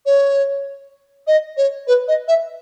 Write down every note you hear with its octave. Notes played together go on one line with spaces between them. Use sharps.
C#5
D#5
C#5
B4
D#5
E5